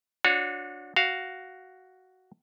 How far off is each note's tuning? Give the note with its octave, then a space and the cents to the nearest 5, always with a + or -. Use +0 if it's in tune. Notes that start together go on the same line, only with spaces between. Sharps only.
D4 +0 F#4 -30 C#5 +0
F#4 +10 F5 +0